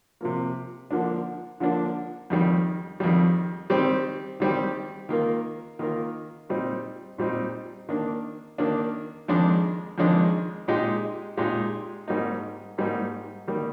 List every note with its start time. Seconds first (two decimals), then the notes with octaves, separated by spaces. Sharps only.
0.21 C3 F3 A#3
0.91 D3 F3 A#3 D4
1.60 D3 F3 A#3 D4
2.30 F2 D#3 G3
3.00 F2 D#3 G3
3.70 D#3 G3 C4 G4
4.40 D#3 G3 C4 G4
5.09 D#3 A#3 F4 A#4
5.79 D#3 A#3 F4 A#4
6.49 A#2 G3 C4 D#4
7.18 A#2 G3 C4 D#4
7.89 D#3 A#3 D4
8.58 D#3 A#3 D4
9.28 F2 D#3 G#3 D4
9.98 F2 D#3 G#3 D4
10.68 A#2 G#3 D#4 G4
11.37 A#2 G#3 D#4 G4
12.08 G#2 G3 A#3 D#4
12.78 G#2 G3 A#3 D#4
13.47 D#3 G3 A#3